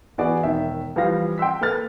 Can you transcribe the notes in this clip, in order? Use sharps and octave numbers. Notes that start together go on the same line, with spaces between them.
E3 B3 F#4 G#4 D5
E1 D#3 E5
E3 F3 G3 G4 F5 A#6
G5 C6 E6 B6
A#3 A4 B4 F6 A6